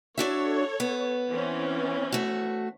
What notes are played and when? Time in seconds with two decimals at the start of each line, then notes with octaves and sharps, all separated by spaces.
0.18 D4 F#4 A4 C#5 E5
0.80 B3
1.30 E3 C4 C#4
2.12 A3 F#4